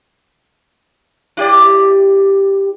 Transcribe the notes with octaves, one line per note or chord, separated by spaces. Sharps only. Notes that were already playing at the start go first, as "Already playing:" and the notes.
E4 G4 D5